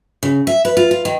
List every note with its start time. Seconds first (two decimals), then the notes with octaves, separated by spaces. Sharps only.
0.23 C#3
0.47 E5
0.65 B4
0.77 F4
0.91 F4
1.05 D#3